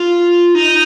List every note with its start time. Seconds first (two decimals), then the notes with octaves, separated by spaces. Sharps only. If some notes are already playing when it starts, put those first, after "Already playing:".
Already playing: F4
0.55 D#4